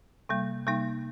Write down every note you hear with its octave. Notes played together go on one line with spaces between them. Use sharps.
C3 G3 A#3
C3 G3 A#3 D#4